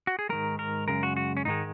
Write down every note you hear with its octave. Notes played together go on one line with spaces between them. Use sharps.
F#4
G#4
G#2 D#3 G#3 A#4
A#4
F#2 C#3 G#3 A#4
F#4
F#4
C#4
G#2 D#3 G#3 D#4